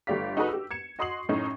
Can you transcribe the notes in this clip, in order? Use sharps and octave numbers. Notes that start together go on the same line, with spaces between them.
G1 A3 G4 D5 F5 B6
D#4 F#4 G#4 A4 B4 D#5
G4 E6
G#6 C#7 E7
F#4 D#5 C6 D#6 C7 F#7
F#2 A2 D#4